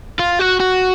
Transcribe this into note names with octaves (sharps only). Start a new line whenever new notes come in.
F4
F#4
F#4